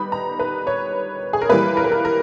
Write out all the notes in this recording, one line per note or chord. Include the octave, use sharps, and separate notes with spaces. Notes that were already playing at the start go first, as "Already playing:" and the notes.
Already playing: G3 B3 D#4 B5
A#5
B4
C#5
G#4
A#4
E3 G3 A#3 B4
A#4
B4
A#4
A#4